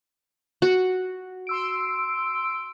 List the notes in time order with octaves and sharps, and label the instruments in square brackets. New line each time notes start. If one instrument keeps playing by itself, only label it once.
[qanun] F#4
[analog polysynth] C6 E6 D7